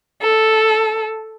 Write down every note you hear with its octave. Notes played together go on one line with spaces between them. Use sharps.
A4